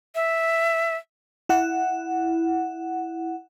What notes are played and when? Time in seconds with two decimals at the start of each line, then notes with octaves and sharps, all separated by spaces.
0.15 E5
1.49 E4 F#5